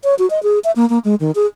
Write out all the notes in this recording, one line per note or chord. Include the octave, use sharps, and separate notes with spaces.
C#5
F#4
D#5
G#4
E5
A#3
A#3
G#3
D#3
G#4